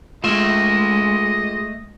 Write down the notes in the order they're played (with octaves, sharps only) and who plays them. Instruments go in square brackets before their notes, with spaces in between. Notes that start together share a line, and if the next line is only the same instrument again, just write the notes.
[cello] G#3 [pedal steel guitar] A3 E5 [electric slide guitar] F4 G#4 [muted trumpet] D#5